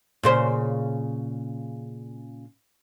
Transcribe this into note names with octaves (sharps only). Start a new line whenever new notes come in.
A#2 C#3 C5